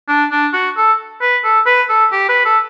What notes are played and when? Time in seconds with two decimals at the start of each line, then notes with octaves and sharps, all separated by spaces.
0.08 D4
0.32 D4
0.54 F#4
0.77 A4
1.21 B4
1.44 A4
1.66 B4
1.89 A4
2.12 G4
2.29 B4
2.45 A4